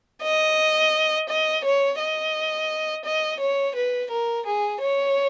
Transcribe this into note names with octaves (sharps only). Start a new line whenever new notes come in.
D#5
D#5
C#5
D#5
D#5
C#5
B4
A#4
G#4
C#5